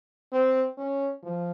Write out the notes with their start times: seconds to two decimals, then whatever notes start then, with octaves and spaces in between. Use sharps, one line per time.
0.33 C4
0.78 C#4
1.23 F3